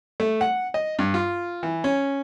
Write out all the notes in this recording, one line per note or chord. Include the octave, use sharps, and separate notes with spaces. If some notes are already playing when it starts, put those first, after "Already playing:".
A3
F#5
D#5
G2
F4
E3
C#4